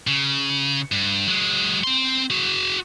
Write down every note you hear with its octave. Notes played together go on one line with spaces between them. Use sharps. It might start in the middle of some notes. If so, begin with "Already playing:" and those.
C#3
G2
F#3 G#3
C4 C6
F#4 G#4